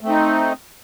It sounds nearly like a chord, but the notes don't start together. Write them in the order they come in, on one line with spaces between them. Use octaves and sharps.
A3 C4 D#4